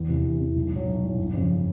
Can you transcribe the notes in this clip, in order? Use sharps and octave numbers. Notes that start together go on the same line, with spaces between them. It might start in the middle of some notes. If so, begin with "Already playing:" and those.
Already playing: E2
C3 E3
E2
C3 E3
B1
A2 F#3
B1
A2 F#3
G1
F2 C#3